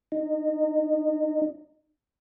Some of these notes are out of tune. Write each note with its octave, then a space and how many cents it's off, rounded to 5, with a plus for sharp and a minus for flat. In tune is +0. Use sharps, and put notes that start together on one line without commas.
D#4 -25